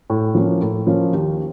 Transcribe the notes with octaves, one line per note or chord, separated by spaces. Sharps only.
A2
F3 A#3 C#4
A2
F3 A#3 C#4
D#2